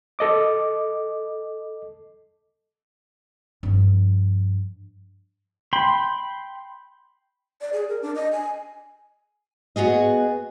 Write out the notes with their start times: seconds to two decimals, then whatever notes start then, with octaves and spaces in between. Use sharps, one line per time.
0.19 A4 D#5 D6
3.63 G2 F3
5.73 G5 B5 C6
7.61 D5
7.73 G#4
7.89 A#4
8.02 D4
8.15 D#5
8.32 G#5
9.76 B3 F#4 G#4 D#5